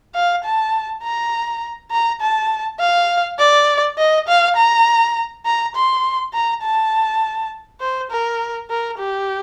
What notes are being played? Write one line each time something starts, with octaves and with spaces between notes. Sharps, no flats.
F5
A5
A#5
A#5
A5
F5
D5
D#5
F5
A#5
A#5
C6
A#5
A5
C5
A#4
A#4
G4